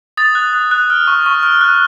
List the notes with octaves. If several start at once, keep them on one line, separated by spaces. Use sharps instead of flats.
D#6 A6
F#6
D#6
F#6
F6
C#6
C#6
F6
F#6